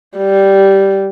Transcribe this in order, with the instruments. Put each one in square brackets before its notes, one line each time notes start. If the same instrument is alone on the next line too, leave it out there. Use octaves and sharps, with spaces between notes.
[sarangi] G3